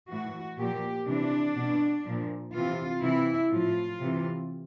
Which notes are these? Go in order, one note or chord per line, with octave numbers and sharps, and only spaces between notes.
A2 E3 F#4
A#2 F3 G4
C3 E3 D4
B2
A#2 F3
C3 E3 F4
C3 E3 E4
A2 F3 F4
C3 E3